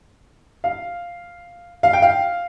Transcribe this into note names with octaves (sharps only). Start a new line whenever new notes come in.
F5
F5
G5
F5